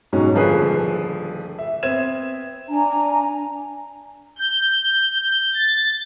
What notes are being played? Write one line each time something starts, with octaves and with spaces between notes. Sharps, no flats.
G#2 B2 F#3 C#4 D#4 G4
D#1 D3 F3 G#4 B4 C7
E5
B3 C4 E5 G#6 E7
D4 G#5 A#5
G6
A6